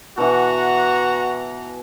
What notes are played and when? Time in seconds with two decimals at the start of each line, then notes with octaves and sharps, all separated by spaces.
0.18 B2 E3 F#4 F#5 A#5